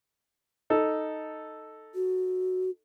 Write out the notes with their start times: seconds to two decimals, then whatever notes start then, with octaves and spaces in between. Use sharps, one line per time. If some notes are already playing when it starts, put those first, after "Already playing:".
0.70 D#4 A4
1.95 F#4